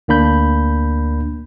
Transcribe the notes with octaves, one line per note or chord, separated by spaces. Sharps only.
D2 A#3 D4 B5 G6